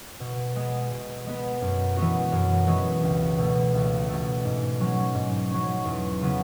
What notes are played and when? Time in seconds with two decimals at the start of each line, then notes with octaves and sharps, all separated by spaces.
0.20 B2
0.55 G#3 B3
0.91 B2
1.27 G#3 B3
1.62 F#2
1.97 E3 G#3 B3 F#4
2.32 F#2
2.67 E3 G#3 B3 F#4
3.03 C#2
3.38 B2 A3
3.74 C#2
4.09 B2 A3
4.44 G#2
4.80 F#3 C#4
5.15 G#2
5.51 F#3 C#4
5.85 E2
6.21 C#3 F#3 B3